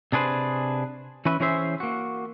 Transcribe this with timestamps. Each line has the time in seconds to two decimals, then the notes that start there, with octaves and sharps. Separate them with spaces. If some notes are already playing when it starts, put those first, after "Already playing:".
0.12 C3 D4 G#4 B4 C5
1.25 E3 C#4 B4 E5
1.40 E3 C#4 G#4 C5 E5
1.80 A#3 F#4